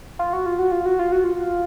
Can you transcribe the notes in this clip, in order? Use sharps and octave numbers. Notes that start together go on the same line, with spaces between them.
F4
F#4
F4
F#4
F4
F#4
F4
F#4
F4